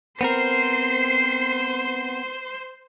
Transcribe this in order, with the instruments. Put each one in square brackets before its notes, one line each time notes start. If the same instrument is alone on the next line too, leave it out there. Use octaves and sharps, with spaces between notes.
[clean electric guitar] B3 C4 A#4 [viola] C5 C6 [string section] C7